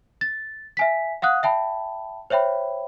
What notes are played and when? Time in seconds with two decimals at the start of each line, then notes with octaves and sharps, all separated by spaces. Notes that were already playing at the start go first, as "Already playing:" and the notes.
0.21 A6
0.77 E5 G#5 B6
1.22 F5 F#5 D#6 F#6
1.43 E5 G5 A5 B5
2.30 C5 C#5 E5 G5 B5